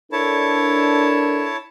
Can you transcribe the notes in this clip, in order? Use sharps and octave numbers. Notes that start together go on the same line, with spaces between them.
D4 E4 A4 A#4 C#5 A5